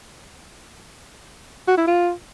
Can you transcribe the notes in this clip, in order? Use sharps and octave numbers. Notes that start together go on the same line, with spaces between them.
F#4
E4
F4